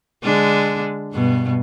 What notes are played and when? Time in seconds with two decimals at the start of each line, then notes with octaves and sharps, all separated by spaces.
0.23 D3 G#3 D4
1.13 G2 B2